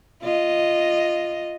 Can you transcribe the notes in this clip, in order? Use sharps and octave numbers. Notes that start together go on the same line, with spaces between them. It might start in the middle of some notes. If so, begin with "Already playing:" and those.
F4 D#5